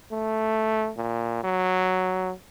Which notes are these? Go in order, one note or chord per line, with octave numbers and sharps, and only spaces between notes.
A3
A#2
F#3